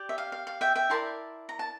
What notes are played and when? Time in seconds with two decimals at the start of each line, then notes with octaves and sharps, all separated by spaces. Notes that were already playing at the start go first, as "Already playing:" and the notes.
Already playing: G4 D5
0.09 E5
0.18 F5
0.32 F5
0.47 F5
0.61 E5 G5
0.75 E5 G5
0.90 E4 A#4 D5 A5 C6
1.49 A#5
1.59 A5